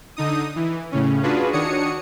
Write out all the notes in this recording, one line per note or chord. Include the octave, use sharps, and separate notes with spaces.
D3 D#4 D#6
E3
A2 C#3 C#4
D4 F4 F#4 G#4 B4
D#3 D4 F#4 C#5 D#6 C#7